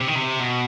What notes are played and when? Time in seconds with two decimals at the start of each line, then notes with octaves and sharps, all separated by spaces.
0.01 C3
0.08 D#3
0.16 C3
0.40 B2